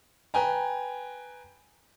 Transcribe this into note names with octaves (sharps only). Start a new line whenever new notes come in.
B4 G5 G#5 A#5